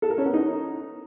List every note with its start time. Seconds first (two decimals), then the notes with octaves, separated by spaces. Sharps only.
0.02 A4
0.10 A#4
0.18 C#4
0.26 B3
0.34 D#4